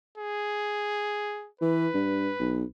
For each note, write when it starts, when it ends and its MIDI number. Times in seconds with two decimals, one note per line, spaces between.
0.17 1.48 68
1.61 1.88 52
1.61 2.67 71
1.94 2.29 43
2.40 2.64 35